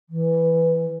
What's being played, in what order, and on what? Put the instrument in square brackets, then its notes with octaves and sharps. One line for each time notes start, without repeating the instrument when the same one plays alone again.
[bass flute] E3